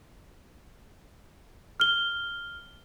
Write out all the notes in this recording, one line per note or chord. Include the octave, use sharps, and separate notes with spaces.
F6 G7